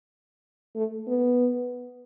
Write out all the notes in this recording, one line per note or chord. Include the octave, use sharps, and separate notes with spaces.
A3
B3